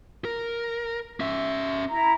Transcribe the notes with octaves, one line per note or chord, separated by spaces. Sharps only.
A#4
C#4 E5
E4 A#5